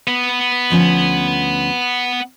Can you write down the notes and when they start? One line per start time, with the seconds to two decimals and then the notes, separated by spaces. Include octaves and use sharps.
0.08 B3
0.70 D2 F3 C#4